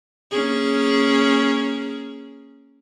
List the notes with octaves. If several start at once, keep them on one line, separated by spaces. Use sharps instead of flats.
A#3 C#4 G#4